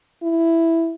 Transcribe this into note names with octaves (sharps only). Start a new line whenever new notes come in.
E4